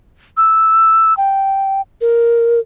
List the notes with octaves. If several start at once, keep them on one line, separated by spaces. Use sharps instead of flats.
E6
G5
A#4